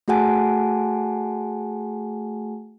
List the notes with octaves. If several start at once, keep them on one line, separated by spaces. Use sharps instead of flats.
A3 F#4 G#4 F#5 G#5 A5